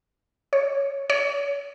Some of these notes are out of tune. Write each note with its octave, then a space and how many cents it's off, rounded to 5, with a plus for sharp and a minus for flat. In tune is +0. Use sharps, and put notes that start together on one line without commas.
C#5 +0
C#5 +35